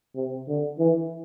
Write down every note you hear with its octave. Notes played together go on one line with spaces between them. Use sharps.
C3
D3
E3